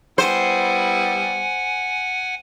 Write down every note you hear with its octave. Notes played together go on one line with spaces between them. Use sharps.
G3 B3 E4 C5 F#5 G#5